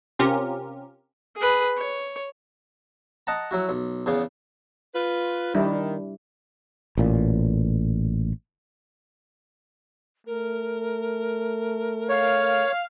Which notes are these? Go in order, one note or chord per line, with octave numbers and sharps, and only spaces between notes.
C3 C4 C#4 F4 G4 A#4
G#4 B4
C#5
D#5 F#5 A5 A#5
F#3 E4 F#4
B1
E2 C#3 B3
F4 B4
D#3 G3 D4 E4
A1 A#2
A3 A#4
C#5 F5